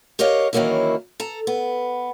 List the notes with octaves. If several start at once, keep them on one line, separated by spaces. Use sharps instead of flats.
G4 A#4 C#5 D#5 F5
D#3 E3 F#3 A#3 C#4 E4
A4 A#5
B3